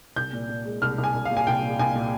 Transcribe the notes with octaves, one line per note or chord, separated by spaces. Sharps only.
C2 G6
A#2
A#2
G#3
C2 F6
C2
G#5
C2
F5
A#2
G#5
C2 G5
A#2
C2 G#5
A#2